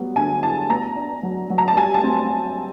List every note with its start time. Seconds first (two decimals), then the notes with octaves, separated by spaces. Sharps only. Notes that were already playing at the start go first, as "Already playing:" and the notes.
Already playing: F#3 G3 B3
0.16 D3 G#5
0.43 E4 A5
0.70 B3 A#5
0.96 D4
1.23 F#3
1.50 F#3
1.58 A#5
1.68 A5
1.76 G3 G#5
1.94 A5
2.04 C4